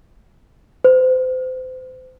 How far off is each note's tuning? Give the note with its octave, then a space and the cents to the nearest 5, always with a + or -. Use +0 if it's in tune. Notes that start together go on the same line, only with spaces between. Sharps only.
C5 -30